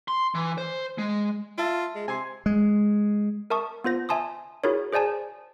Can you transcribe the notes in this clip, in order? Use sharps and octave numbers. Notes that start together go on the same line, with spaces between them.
C6
E3
C5
G#3
F4 E5 A5
G#3
C3 G#5 C6
G#3
A#4 E5 A5 C#6 D#6
B3 F4 C5 A#6
E5 G#5 A5 C6 D#6
E4 F#4 G#4 A#4 C#5
G#4 C5 D5 G#5 A5